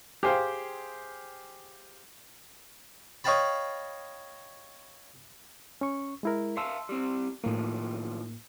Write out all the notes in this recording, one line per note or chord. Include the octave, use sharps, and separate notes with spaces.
G4 G#4 C5 F5 G5
C#5 D#5 F5 G5 A5 B5
C#4 C#6
G#3 E4 A#4
E5 F5 A5 C6 E6
G3 C4
F#2 A2 D#3 F3 A#3